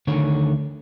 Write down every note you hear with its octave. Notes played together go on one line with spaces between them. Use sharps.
D2 D3 D#3 C#5